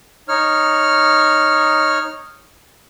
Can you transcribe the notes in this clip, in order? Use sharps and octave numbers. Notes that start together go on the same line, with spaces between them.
D#4 C#5 F6